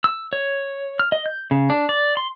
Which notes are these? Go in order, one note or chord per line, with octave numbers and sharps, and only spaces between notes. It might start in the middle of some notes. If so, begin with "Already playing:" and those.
E6
C#5
F6
D#5
G6
C#3
D4
D5
C6